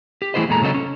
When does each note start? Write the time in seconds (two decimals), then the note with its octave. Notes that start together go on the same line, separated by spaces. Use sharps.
0.22 G4
0.34 E3 A3 E4 G#4 C5 D#5
0.49 E2 A#2 G#3 A4 A#5
0.62 C#3 F#3 C#4 A4 D#5
0.74 C#4